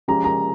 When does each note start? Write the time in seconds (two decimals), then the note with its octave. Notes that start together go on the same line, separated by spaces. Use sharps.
0.08 F3 G#3 C#4 G4 A#5
0.24 A#5